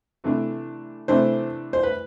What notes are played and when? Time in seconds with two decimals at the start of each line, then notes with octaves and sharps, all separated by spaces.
0.24 C3 E3 A3 D4
1.08 C3 E3 A3 D4 C5
1.73 C5
1.83 B4